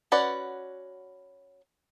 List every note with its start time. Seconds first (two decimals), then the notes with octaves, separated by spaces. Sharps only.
0.12 C#4 F#4 B4 D5 F#5